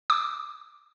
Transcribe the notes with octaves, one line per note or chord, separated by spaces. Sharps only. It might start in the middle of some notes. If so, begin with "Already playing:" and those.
D6